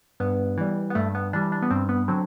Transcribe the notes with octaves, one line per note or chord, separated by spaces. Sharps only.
G2 B3
E3 G3
B3
G2 A3
B3
E3 G3 D4
D4
B3
G2 C4
B3
D3 F#3 C4